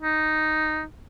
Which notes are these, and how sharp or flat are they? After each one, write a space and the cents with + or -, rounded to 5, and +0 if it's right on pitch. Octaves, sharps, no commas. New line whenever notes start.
D#4 -5